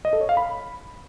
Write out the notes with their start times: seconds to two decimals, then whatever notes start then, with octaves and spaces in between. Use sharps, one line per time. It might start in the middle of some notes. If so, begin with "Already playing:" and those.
0.05 D#5
0.13 A4
0.21 C#5
0.29 F5
0.37 B5